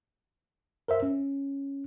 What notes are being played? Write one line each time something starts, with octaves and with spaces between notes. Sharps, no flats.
A#4 C5 E5
C#4